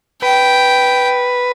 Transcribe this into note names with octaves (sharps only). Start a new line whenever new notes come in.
B4 G5